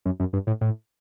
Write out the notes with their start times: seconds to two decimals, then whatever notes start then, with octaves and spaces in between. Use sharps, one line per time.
0.05 F#2
0.20 F#2
0.33 G2
0.47 A2
0.61 A2